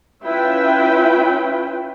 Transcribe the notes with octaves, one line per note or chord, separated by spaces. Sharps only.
C#4 E4 F4 B4 E5 G5